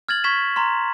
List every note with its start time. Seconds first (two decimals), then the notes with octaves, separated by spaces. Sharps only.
0.09 F6 G#6 A6 F#7
0.24 C#6 G#6 B6 E7
0.56 A#5 C6